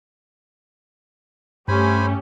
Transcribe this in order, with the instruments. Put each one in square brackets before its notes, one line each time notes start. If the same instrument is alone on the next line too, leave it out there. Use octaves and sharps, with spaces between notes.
[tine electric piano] G2 [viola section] A3 C#4 G4 [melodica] C5 G#5 B5